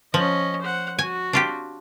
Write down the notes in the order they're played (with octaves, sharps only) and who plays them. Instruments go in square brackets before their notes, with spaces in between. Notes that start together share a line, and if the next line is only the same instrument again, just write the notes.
[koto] F3 [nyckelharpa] C#4 D#5
[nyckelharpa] C5 F#5
[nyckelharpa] F#4 [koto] G#5
[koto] D4 F4 G4